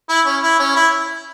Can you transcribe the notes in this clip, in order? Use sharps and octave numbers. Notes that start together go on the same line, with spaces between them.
E4
C#4
E4
C#4
E4